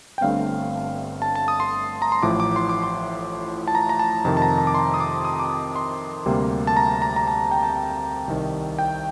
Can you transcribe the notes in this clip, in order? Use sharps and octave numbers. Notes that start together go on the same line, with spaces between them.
G5
G1 G2 D3 A3 C4 F5
A5
A5
D#6
C6
A#5
C6
A1 A2 F3 A3 D6
D6
C6
D6
C6
A5
A#5
A#5
A5
F2 C3 D#3 A5
A5
A#5
A5
D6
C6
D#6
D6
D#6
D6
D#6
C6
D2 C3 G3 A#3
A5
A#5
A#5
A#5
A5
G5
A5
G5
C2 C3 D#3
G5